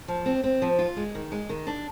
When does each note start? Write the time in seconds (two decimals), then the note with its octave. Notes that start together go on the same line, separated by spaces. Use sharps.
0.08 F3
0.26 C4
0.44 C4
0.62 F3
0.79 F4
0.97 G#3
1.15 D#3
1.32 G#3
1.49 D#3
1.67 D4